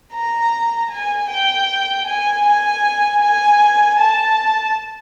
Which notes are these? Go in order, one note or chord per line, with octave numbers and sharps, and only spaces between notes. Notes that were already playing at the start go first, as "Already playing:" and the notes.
A#5
G#5
G5
G#5
G#5
G#5
A5